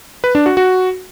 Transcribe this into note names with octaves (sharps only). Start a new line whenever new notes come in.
B4
D4
F#4
F#4